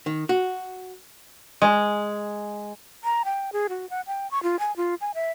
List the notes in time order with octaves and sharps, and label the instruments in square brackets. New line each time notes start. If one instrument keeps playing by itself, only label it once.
[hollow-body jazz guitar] D#3
F#4
[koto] G#3
[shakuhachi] A#5
G5
G#4
F#4
F#5
G5
C#6
F4
G#5
F4
G#5
E5